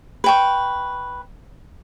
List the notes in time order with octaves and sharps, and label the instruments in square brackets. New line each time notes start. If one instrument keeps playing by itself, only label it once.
[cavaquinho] B4 G5 C#6